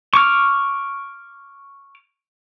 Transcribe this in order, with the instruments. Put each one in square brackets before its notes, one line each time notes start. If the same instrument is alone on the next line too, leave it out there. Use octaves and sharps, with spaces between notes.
[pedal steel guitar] C#6 D6 F6